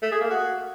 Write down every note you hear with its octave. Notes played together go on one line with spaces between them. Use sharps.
A3
G#4
A#3
F#4